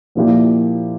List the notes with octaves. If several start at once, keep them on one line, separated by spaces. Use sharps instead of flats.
A#2 F3 A#3 E4 G4